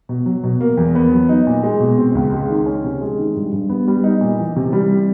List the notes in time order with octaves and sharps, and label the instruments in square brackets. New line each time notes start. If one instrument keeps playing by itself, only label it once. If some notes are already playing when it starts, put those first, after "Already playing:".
[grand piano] B2
F#3
B2
A#3
E2
B3
F#3
D#4
A#2
G#3
B2
C4
C#2
G#3
D#3
C#4
C3
G#3
D#3
G2
G2
B3
G3
D#4
A#2
E3
C3
G3